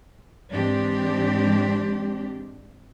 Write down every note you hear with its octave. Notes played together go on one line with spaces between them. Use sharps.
G#2 E3 G#3 C4 D4 G4